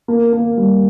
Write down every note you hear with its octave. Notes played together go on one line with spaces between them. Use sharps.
A#3
A#3
G3